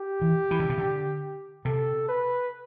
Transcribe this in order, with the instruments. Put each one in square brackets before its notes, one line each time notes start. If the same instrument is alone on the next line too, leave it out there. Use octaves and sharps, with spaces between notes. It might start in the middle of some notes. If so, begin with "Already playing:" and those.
Already playing: [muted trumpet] G4
[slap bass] E3
E3
D3
C3
D3
[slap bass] C3 [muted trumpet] A4
[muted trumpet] B4